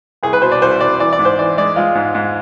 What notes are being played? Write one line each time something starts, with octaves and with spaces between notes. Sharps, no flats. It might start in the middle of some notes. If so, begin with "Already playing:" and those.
C2 G#4
B4
B2 C5
D5
C2 C5
C2 D5
E3 D5
D5
G#2
C5
E3 D5
G#3 D5
G#3 F4
G#2
G#2